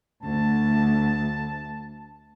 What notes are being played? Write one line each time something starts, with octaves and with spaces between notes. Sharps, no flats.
D2 A5